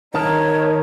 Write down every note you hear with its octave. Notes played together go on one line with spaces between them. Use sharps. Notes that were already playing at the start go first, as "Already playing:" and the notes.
D#3 D#4 A#4 C#5 A5